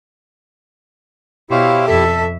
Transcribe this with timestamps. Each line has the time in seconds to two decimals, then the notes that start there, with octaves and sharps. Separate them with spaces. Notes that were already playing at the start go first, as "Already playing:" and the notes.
1.51 B2 E4 G4 C5 C#5 F5
1.86 F2 A4 E5